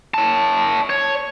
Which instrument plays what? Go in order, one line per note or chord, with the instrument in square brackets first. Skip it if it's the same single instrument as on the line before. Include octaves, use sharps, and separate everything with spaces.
[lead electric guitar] C#5 A5
C#5